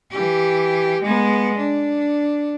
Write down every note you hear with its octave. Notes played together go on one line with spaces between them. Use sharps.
E3 G4
G#3 B3
D4